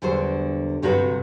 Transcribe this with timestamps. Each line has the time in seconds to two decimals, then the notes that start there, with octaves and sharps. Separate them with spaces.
0.02 E2 D3 F#3 G3 C5
0.82 D2 G2 C3 F#3 F#4 B4